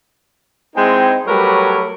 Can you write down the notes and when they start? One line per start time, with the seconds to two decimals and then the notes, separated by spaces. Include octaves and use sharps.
0.75 G#3 C4 D#4 E4 G5
1.26 F#3 G3 A3 A#4 B4 C#5